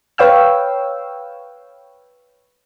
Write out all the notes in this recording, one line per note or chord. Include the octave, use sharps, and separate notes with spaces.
B4 C#5 F5 G5 E6